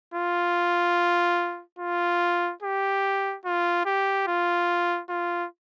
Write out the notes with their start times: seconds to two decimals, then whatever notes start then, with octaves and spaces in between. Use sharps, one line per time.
0.14 F4
1.79 F4
2.62 G4
3.45 F4
3.86 G4
4.27 F4
5.09 F4